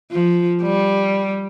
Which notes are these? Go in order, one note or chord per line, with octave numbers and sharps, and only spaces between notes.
F3
G3